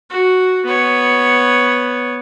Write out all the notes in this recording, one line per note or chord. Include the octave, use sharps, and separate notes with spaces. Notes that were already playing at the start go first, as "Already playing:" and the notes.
F#4
B3 C#5